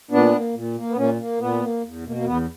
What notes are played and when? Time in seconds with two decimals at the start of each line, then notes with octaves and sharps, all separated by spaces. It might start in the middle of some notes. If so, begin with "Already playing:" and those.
0.11 A#2 B3 D4
0.33 A#3
0.54 A#2
0.76 A#3
0.90 B3
0.96 A#2 A#3 C#4
1.18 A#3
1.39 A#2 B3
1.61 A#3
1.83 E2
2.04 B2 A#3
2.16 A#3
2.25 E2 B3